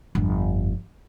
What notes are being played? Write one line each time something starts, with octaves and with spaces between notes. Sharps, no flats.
G1 F2